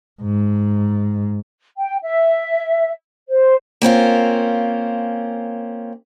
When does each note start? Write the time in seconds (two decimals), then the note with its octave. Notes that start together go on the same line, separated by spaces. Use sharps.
0.22 G#2
1.77 G5
2.03 E5
3.28 C5
3.82 A#3 C4 C#4 F4